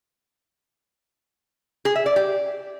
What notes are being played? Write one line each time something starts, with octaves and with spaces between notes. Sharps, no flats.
G#4
E5
D5
G4